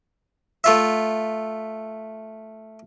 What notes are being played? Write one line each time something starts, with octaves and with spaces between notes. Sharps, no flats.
A3 F4 E5